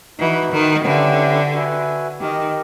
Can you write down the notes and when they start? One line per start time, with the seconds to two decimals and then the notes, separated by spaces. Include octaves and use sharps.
0.19 E3 D#4 F#4 B4
0.53 D#3
0.87 D3 C#4 E4 G4 B4
1.54 F#4 B4 E5 G#5
2.20 D#3 G4 A#4 D#5